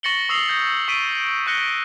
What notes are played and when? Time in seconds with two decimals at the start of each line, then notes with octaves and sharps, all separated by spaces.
0.03 C#6 A6 A#6 C#7 F#7 G7
0.29 C#6 D#6 E6 C7 F7 G7
0.48 D#6 G6 A#6
0.88 C#6 E6 B6 D7 D#7
1.47 C#6 F#6 A#6 C#7 G7